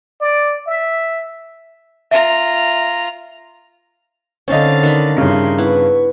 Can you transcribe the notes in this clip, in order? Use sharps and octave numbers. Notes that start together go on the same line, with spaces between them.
D5
E5
F4 E5 A#5
D3 C4 C#4 D#4 D#5 F5 A6
D#3 D4 B5
G2 C#3 D#4 E4 C6
B3 E4 B4 C#6